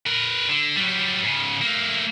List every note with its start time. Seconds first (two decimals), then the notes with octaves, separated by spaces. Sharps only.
0.06 A#4 B4
0.49 D3
0.76 F#3 G3
1.23 G#2 C#3
1.62 A3 A#3